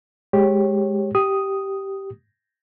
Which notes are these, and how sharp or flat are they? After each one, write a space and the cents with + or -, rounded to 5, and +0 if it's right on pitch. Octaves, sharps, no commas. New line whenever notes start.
G#3 +0 G4 +0 C#5 -20
G4 -10 D#6 +0